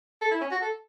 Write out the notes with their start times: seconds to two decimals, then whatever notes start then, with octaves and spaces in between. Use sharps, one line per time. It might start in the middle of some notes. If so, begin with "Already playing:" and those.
0.21 A4
0.31 E4
0.41 C#4
0.51 F#4
0.61 A4